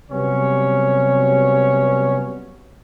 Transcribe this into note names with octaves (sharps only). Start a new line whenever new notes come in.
C3 F#3 G3 B3 C#4 C#5